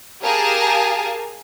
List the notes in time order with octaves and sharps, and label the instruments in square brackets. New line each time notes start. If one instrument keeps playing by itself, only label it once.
[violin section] G4 G#4 A#4 F5 G#5 A5